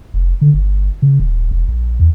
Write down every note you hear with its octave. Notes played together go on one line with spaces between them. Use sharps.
F1
D3
G1
C#3
D#1
E1
A#1
E2